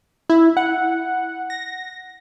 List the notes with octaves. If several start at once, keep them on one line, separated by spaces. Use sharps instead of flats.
E4
F#5
A#6